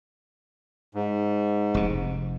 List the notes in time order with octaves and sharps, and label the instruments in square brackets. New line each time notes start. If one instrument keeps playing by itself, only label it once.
[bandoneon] G#2
[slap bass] F1 C3